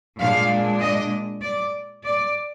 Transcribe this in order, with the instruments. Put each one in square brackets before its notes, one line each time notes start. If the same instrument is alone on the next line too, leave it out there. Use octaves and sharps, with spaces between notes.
[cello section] A#2 G#3 D4 F5
D#5
D5
D5